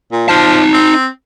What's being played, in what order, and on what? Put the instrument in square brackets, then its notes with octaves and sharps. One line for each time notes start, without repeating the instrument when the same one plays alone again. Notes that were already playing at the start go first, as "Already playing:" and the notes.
[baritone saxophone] A#2
[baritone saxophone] F3 [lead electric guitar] D#4 A5
[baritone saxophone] C4